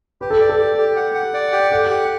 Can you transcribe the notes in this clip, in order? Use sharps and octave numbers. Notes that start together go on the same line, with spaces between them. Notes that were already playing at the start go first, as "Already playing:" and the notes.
G4 B4
A4
D5
A4
G4
G4
F#5
F#5
D5
G4
A4 F#5
G4